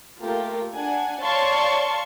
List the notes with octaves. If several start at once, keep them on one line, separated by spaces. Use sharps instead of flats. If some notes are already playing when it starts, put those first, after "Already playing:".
A3 A#3 F4 G4 A#4
D4 F#5 G#5
C#5 D5 F5 A5 C6 C#6